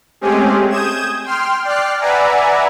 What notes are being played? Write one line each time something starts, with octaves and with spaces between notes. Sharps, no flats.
G#3 A3 C4 C#4 G4 G#4
D#6 G6 G#6 E7
G5 C6 F6
D5 G5 F6 F#6 C7
B4 D5 E5 F#5 G#5 A#5